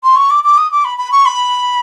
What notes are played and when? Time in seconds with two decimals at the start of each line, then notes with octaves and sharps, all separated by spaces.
0.03 C6
0.16 C#6
0.30 D6
0.44 D6
0.58 D#6
0.71 D6
0.85 B5
0.98 B5
1.12 C#6
1.26 B5